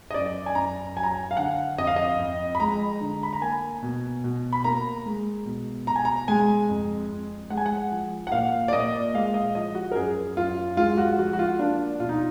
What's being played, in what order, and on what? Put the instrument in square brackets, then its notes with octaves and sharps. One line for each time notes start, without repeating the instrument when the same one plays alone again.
[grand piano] D#5
F#2 D5
G#5
F#2 A#5
F#3 G#5
A#5
G#5
F5
D3 F#5
F2 D#5
F5
D#5
F2
B5
G#3 A#5
D3
B5
A#5
A#3 G#5
B2
B2
B5
A#3 A#5
G#3
B2
B2 A#5
G#5
A#5
G#3 G#5
F2
F2
G#3 F#5
G#5
F#5
F3
F#5
A#2 F5
D5
A#2 D#5
G#3 F5
D#5
F3 D#5
F#4
A#4
F#2 G#4
F#2 F4
G#3 F4
F#4
F3 F#4
F#4
F4
A#3 D4
B2 F4
D#4